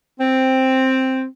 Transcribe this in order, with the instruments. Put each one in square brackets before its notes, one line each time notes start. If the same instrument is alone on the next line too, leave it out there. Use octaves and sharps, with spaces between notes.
[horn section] C4